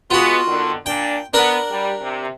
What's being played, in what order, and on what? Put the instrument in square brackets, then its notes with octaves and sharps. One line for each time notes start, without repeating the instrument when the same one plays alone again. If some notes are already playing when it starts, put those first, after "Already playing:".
[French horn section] G#3 B3 [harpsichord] F4 F#4
[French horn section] D3 D#3 B3
[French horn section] A#2 D4 [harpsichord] G5
[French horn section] B3 [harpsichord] D4 A#4 F#5
[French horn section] G3
C3